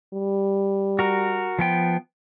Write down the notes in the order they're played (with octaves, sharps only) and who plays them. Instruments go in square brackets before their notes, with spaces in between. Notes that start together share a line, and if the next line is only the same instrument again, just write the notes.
[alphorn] G3
[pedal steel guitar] F#4 A#4
F3 B3 G5